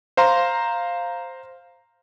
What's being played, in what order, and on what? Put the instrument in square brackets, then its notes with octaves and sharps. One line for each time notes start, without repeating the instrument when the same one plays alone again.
[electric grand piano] C5 F5 A#5 C6